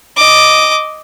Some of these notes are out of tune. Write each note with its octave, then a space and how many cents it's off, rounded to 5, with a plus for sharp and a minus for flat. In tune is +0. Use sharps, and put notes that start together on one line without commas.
D#5 +0 D6 +0